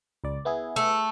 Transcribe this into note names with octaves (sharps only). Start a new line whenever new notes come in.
C#2 D5
B3 E4 G#4
A3